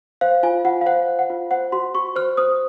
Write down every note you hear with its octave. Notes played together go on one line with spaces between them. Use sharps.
C5 F5
F4 G#5
F4 F#5
F5
C5 F#5
C5
F#5
F4
C5 F#5
F#4 C6
F#4 C#6
C5 F6
C5 D#6